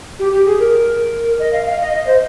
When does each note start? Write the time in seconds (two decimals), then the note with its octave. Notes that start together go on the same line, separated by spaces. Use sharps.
0.19 G4
0.33 G4
0.46 G#4
0.60 A#4
1.40 D#5
1.53 F5
1.66 F5
1.80 D#5
1.93 D#5
2.07 C5